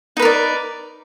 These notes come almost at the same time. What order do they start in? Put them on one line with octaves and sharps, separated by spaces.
D#4 B4 A#4 D5